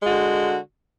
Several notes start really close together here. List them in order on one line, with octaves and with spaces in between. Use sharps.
G#3 F#4 D3